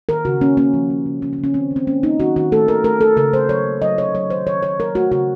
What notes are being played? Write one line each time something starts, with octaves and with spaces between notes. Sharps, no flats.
D#3 A#4
C#3 F#4
A#3 C#4
A#3 C#4
F3
A#3
C#3
C#3 C#4
C#4
C#3
C#4
D#3 C4
D#3
C4
A#3 C#4
A#3 D#4
D#3 F#4
D#3 F#4
A3 A4
D#3 A#4
A3 A#4
A3 A4
C#3 A#4
A3 C5
F#3 C#5
A#3
F#3 D#5
C3 C#5
F#3 C#5
D#3 C5
D#3 C#5
D#3 C#5
F#3 A#4
A3 F#4
C#3 F#4